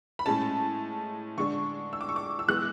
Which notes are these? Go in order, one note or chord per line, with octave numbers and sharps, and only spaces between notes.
B5
A2 G#3 C#4 A5
D3 G#3 D4 C#6
E6
D6
C#6
D6
E6
E3 G#3 B3 F#6